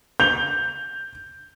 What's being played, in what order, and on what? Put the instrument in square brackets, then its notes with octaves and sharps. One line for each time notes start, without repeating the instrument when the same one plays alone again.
[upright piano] G6 F7 G7